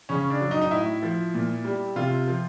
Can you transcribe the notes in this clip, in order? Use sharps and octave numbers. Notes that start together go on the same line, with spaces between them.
C#3 C#4
D4
F#3
D#4
D#4
A2 E4
F3
A#2
G3
C3 F4
F3